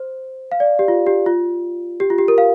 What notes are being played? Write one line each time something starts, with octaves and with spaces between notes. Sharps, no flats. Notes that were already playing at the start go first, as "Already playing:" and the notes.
Already playing: C5
F5
D5
G4
F4
G4
F4
G4
F4
G4
A#4
F5